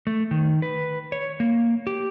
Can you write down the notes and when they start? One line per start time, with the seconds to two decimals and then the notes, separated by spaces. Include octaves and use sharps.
0.07 A3
0.31 D#3
0.62 B4
1.12 C#5
1.40 A#3
1.87 G4